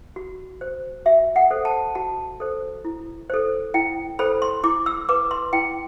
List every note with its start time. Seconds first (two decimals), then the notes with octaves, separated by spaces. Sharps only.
0.16 F#4
0.61 C5
1.06 F#4 E5
1.36 F#5
1.51 A4 C5
1.65 A5
1.95 F#4 A5
2.40 A4 C5
2.85 E4
3.30 A4 C5
3.74 E4 G5
4.19 A4 C5 B5
4.42 C6
4.64 E4 D6
4.86 E6
5.09 B4 D6
5.31 C6
5.53 E4 G5